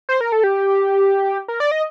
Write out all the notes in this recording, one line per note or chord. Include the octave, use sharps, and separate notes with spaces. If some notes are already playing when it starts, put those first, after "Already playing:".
C5
A#4
A4
G4
A#4
D5
D#5